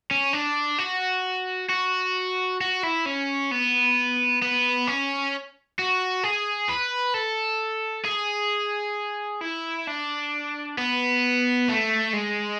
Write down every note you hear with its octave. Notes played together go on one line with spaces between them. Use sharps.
C#4
D4
F#4
F#4
F#4
E4
C#4
B3
B3
C#4
F#4
G#4
B4
A4
G#4
E4
D4
B3
A3
G#3